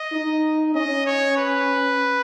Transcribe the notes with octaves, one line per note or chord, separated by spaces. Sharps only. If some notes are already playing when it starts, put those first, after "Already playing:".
Already playing: D#5
D#4
C#4 D#5
C#5
B4